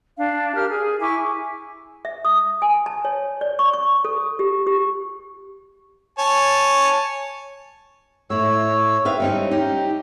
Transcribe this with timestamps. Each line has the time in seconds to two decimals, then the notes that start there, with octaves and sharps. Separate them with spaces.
0.17 D4 F5
0.55 G4 A#4 F6
0.69 G#4
1.01 E4 G#5 C#6 D6
2.05 E5
2.25 D#6
2.62 G#5
2.86 A5
3.05 C#5
3.41 D5
3.59 C#6
3.73 C#6
4.05 A4
4.39 G4
4.67 G4
6.19 C#5 G#5 A5
8.30 A2 E4 C#5 E6
9.05 C4 B4 E5 F5
9.20 G3 C#4 D#4
9.51 D#4 G4